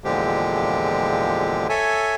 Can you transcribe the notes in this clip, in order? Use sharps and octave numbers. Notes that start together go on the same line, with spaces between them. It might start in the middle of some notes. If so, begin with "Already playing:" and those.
E2 A#2 D3 F3 G#3 G4
A4 C#5 E5 G#5